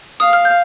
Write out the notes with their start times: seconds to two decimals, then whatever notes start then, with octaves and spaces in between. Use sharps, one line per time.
0.20 F5 D#6
0.33 F6
0.45 G6